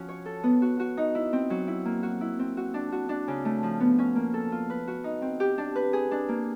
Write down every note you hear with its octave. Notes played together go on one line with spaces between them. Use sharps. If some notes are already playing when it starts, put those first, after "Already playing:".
Already playing: F3 C#4 F#4
C#5
A4
B3
F#4
F#4
D#4
E4
C4
F#3
E4
A#3
F#4
E4
C4
F#4
D4
F#4
D4
C#3
A3
F3
B3
C#4
A#3
A4
F4
B4
F#4
D#4
C4
G4
D4
B4
G#4
D4
A#3